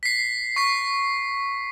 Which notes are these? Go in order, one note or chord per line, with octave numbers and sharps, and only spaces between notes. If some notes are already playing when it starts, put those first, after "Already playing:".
B6 C7
C#6 B6 C7